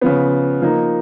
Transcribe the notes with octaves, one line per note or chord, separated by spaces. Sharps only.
C#3 F3 B3
F3 A#3 D#4